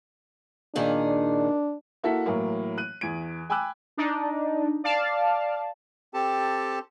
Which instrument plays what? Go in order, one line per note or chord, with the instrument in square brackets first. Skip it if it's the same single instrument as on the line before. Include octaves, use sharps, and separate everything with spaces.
[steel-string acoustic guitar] A#2 D#3 G#4 [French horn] D4
[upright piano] A#3 E4 F#4 A4 E5 B6
A2 E3 F#3 A#3
F#6 D#7
E2 G#6 D7
G5 G#5 B5 D6 E6 F#6
[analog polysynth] D4 D#4
D5 F5 A5
[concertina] C4 G4 A4 A5